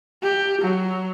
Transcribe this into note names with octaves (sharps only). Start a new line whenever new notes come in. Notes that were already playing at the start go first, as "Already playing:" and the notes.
G4
F#3